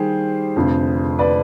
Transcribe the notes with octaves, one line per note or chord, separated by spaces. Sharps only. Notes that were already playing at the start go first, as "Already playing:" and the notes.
Already playing: D#3 G3 G4 G#4 C5
F1 F2 D3
B4 D5